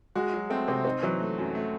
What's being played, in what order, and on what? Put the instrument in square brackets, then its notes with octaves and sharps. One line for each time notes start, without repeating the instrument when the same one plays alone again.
[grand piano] G#3 [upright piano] F#4
[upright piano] F#3
[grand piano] A3 [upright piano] C4
[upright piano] C3 [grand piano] C4
[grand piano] C4 [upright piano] D#4
[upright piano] E3 [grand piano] F#3
[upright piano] A3
F#2
A3